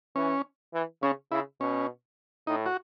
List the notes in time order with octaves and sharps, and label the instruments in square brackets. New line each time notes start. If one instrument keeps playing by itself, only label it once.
[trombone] E3 [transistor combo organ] C#4
[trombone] E3
[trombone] C#3 [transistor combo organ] C#4
[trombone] C#3 [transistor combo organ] E4
[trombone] B2 [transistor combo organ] C#4
[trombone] A2 [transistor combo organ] D#4
[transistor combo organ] F#4